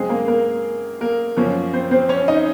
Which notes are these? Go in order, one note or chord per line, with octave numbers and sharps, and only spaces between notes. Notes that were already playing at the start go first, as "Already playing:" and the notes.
Already playing: F#2 C#3 G#3 C4 G#4
A#3 A#4
A#3 A#4
A#3 A#4
F#2 F3 A#3 C#4
C4 C5
C4 C5
C#4 C#5
D#4 D#5